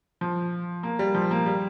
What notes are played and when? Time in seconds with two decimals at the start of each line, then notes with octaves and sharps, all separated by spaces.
0.21 F3
0.83 A#3
0.99 G3
1.15 F3
1.31 A#3
1.46 G3